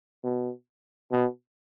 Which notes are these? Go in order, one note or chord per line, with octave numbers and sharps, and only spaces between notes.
B2
B2